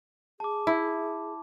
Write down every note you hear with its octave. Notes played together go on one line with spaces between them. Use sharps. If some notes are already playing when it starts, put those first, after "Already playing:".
G#4 A5 D6
E4